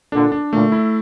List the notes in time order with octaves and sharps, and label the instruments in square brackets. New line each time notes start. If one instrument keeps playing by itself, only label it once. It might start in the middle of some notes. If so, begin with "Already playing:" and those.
[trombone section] A#2 D3 [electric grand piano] D4
[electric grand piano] D4
[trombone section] A#2 D3 [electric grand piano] A3
[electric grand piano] E4